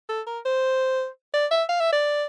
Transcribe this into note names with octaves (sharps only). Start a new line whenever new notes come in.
A4
A#4
C5
D5
E5
F5
E5
D5